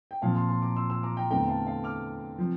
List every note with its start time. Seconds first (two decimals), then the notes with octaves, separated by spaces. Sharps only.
0.11 G5
0.22 A#2 F3 C4 F5 A5
0.35 A5 C6
0.49 A5 C6
0.62 A#5 D6
0.76 C6 E6
0.90 C6 E6
1.03 A#5 D6
1.17 G5 A#5
1.30 E2 D3 A3 C4 G5 A#5
1.48 F5 A5
1.66 F5 A5
1.84 D6 F6
2.38 C3 F3